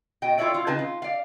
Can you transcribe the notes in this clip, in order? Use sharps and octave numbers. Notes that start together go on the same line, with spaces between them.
B2 D#5 G5
E4 F4 A4 C#5 D5 E5
F4
C#3 C4 D#4 G#4 B4 A5
F4
D5 F5